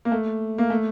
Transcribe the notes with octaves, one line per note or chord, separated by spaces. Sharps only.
A#3
A3
A#3
A3